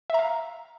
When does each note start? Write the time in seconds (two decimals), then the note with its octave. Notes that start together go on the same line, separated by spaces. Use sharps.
0.10 E5
0.14 A#5
0.19 F5